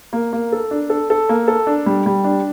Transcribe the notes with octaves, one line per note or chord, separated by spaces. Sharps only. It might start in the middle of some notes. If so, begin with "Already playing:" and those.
A#3
A#3
A4
D4
A4
A4
A#3
A4
D4
G3
G3
D4